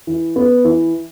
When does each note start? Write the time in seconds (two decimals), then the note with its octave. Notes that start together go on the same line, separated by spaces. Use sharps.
0.07 E3
0.36 B3
0.65 E3